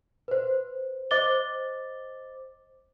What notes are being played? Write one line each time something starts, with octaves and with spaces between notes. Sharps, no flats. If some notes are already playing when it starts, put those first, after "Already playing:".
B4 C5
C5 D#5 D6 A6 G7